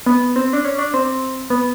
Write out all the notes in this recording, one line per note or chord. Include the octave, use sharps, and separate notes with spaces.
B3
C4
D4
C#4
D4
C4
B3